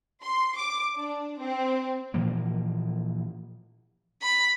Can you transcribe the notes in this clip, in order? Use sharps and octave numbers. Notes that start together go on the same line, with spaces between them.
C6
D6
D4
C4
A#2 E3 F3 A#3
B5